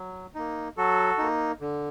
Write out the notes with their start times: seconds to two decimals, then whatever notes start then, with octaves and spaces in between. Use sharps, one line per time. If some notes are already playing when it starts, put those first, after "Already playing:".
Already playing: F#3
0.35 A#3 D#4
0.77 F#3 F#4 A4
1.18 A#3 D#4
1.61 D3